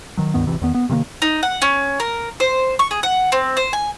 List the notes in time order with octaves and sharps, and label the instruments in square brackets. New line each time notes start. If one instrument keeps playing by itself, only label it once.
[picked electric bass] D#3 F#3
C#2 G2 D#3 B3
D#1 G#1 C3 E3
E2 D#3 B3
B3
C3 D#3 A3 A#3
[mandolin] D#4
F#5
C#4
A#4
C5
C#6
G#4
F#5
C4
C5
G#5